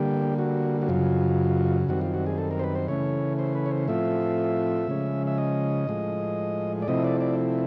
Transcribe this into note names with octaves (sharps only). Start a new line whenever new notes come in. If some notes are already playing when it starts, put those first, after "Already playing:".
Already playing: D3 G3 A#3 G4
F#4
F#4
F#2 C#3 F#3 F4
F#2 D#3 G3 C4 F#4
F4
F#4
G#4
A4
A#4
C5
B4
C5
C#3 E3 A3 C#4 C#5
C5
B4
C#5
C5
A2 F3 A3 C4 F4 E5
C#3 F3 G#3 C#4
E5
D#5
A2 F3 G#3
D5
C3 F3 A3 C4 E4 D#5
D5
D5